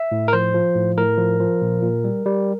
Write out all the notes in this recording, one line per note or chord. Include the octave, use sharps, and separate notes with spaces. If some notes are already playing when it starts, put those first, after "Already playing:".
Already playing: E5
A2
A#4
F3 C5
F3
A2
A2 A#4
F3
F3
A#2
A#2
G3
G3